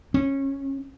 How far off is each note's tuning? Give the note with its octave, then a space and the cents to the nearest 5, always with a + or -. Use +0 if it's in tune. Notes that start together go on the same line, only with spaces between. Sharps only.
C#4 -15